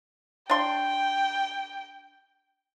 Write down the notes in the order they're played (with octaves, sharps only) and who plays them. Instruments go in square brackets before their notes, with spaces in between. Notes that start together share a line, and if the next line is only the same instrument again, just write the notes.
[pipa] D4 C6 [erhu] G5